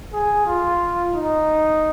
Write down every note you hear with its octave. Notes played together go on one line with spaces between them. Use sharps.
G#4
F4
D#4